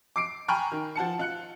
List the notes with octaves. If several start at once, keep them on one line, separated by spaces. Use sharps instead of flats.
D6 C7 D7
G5 G#5 A#5 B5 C#6 F6
D#3
F3 F#5 A5 C#7
F4 F#6 C#7